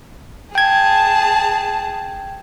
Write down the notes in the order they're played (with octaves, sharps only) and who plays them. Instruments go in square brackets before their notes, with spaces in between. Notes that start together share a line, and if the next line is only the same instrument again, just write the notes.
[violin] G#4 A5 [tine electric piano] G5 G#6